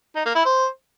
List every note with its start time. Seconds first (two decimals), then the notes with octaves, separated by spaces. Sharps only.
0.16 D#4
0.26 A#3
0.35 E4
0.45 C5